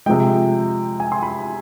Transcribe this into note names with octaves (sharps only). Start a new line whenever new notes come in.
C3 F3 G#3 G5
G#5
C6
B5